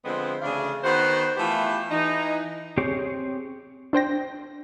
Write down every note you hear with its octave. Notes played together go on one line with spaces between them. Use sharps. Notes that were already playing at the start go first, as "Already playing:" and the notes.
D3 F3 G#3 B3 C4
D2 C#3 E3 D4 G#4 F5
D#3 B3 F#4 C5
E3 A3 B3 E4 F4 G4
E3 D#4
C4 G4 G#4 C#5
D4 C5 G5 A#6